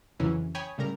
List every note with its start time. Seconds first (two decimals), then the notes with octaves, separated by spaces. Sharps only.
0.19 F2 C#3 E3 F#3 C#4 E4
0.55 C#5 G5 G#5 B5 C#6 D#6
0.78 A2 C#3 G3 A#4 A#5